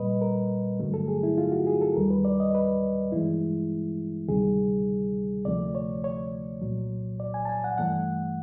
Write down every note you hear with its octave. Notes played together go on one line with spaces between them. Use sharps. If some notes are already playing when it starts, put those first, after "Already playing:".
Already playing: A#2 G3 B4 D#5
A#4
G2 D3 F#3 A3
A4
G#4
E4
F4
F#4
G#4
A4
D#2 D#3 G3 A#4
B4
D5
D#5
B4
G2 E3 G#3 E4
D2 C3 D#3 G3 G#4
D2 C3 F3 A3 D5
C#5
C#5
C2 A#2 F#3
D5
G#5
A5
G#5
F#5
G2 E3 A3 F#5